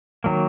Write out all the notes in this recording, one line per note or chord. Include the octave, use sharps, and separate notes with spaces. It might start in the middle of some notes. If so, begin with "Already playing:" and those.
D#3 F#3 A#3